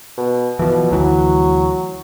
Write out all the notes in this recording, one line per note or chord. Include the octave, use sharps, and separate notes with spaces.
B2
B2 E3 F3
D2 E3 F#3